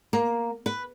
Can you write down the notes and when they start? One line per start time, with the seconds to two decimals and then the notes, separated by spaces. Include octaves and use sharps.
0.13 A#3
0.66 B4